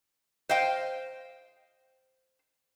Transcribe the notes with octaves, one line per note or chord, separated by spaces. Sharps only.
C5 D#5 F5 G5